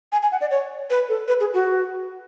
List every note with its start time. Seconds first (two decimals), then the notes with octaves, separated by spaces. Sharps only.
0.12 G#5
0.23 G#5
0.32 F#5
0.41 D5
0.51 C#5
0.90 B4
1.09 A4
1.28 B4
1.40 G#4
1.54 F#4